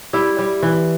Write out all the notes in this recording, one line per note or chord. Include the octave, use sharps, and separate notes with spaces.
G3 E4
G3
E3